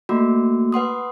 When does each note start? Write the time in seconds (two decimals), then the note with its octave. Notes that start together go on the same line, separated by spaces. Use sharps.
0.09 A3 A#3 F#4
0.72 B4 F#5 C6 D#6